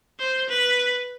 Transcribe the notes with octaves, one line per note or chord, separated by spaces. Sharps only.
C5
B4